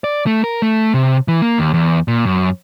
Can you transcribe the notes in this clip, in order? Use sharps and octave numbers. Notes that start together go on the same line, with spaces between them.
D5
A3
A#4
A3
C3
E3
A#3
D#2
E2
A#2
F#2